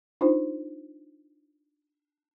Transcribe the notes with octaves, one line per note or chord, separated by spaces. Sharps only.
D4 D#4 F4 C5